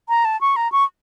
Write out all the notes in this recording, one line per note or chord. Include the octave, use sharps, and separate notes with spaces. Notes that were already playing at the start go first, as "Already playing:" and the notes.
A#5
A5
C#6
A#5
C#6